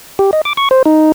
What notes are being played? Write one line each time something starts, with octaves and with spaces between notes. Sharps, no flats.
G4
D#5
D6
C#6
C5
D#4